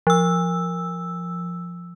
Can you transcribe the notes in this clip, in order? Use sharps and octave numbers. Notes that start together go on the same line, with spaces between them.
F3 E6